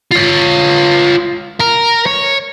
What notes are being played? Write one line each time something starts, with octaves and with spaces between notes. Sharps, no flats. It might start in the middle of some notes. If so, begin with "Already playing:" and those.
F4 C#5
A#4
C#5